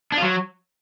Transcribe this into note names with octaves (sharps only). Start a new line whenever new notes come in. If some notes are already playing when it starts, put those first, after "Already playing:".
D4
F4
F#3